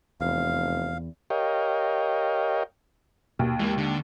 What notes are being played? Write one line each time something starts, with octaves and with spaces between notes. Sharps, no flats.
F1 E2 F5
G4 A#4 C#5 D#5 F5 G5
D#2 B2
E3 G#3 A#3
D3